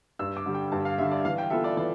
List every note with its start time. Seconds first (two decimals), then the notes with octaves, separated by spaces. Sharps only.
0.19 G2 E6
0.37 D6
0.46 D3 G3
0.54 G5
0.72 G2 A5
0.85 F5
0.98 D3 G3 E5
1.12 D5
1.25 E3 F5
1.38 G5
1.50 B3 F4 A4 E5
1.64 D5
1.77 E3 D5